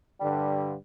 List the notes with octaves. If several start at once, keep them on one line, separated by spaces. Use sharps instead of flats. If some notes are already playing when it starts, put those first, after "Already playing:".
G2 D3 G3